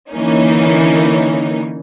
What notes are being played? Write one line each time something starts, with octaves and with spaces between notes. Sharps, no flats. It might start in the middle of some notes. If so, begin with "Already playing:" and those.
D3 E3 A#3 C#4 D#4